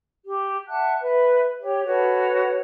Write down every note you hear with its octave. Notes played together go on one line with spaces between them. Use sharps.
G4
E5 F#5 A5 F#6
B4 E5
G4 C#5
F#4 A4 B4 C#5